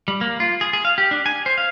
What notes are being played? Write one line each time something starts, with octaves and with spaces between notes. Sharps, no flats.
G3
A#3
F4
G#4
G#4
F5
G4
D4
G#5
C5
F5